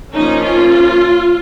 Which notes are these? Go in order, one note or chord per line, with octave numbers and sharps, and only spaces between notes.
F3 A#3 C#4 D#4
F4